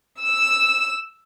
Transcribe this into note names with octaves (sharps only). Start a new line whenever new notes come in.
E6